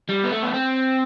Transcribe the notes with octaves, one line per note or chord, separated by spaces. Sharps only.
G3
B3
A3
B3
C4